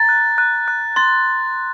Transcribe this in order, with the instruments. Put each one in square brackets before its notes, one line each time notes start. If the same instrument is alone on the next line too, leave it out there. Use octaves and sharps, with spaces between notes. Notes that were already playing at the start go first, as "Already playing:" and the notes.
Already playing: [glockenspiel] A#5 [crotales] A6
[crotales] F#6
F#6
F#6
[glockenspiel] C6 [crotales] A6